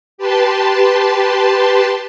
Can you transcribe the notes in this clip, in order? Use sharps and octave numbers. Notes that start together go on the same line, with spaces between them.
G4 B4 A5 C6